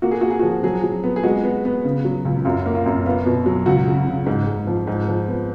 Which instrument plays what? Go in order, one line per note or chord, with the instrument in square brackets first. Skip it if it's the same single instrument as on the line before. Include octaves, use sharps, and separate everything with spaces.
[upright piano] A#3 F#4
G#4
A#3 F#4
G#4
F#4
F3
F#3 G#4
F#3
B3
G#4
G#3 F#4
B3
B3
C#3
F#3
C#2
F#2 F4
A#3
F4
F#2
B3 F4
B2
F#3
C#2 F#4
C#3
C#3
G#2
G#2
F3
G#2
F3
B3